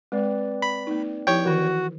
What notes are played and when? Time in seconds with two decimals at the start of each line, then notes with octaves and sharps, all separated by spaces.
0.12 G#3 C4 B4 D5
0.62 B5
0.87 A#3 D#4
1.27 F3 E4 G4 C#5 G5
1.44 D#3 E3 F#4 A#4